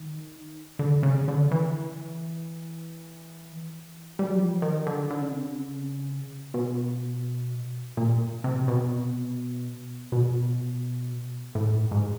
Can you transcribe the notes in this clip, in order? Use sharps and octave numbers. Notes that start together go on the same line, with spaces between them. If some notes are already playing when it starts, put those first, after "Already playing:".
Already playing: D#3
D3
C#3
D3
E3
G3
F#3
F3
D#3
D3
D3
C#3
C3
C#3
B2
A#2
C3
B2
B2
A2
G#2